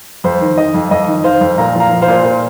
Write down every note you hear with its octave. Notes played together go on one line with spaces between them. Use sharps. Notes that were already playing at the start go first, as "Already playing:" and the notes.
F2 C5
D#3
D#3 D#5
F2
F2 D#5
D#3
D#3 C5 F5
F2
A#2 F5 A#5
F3
F5 A#5
F3
C5 F5
A#2
A#2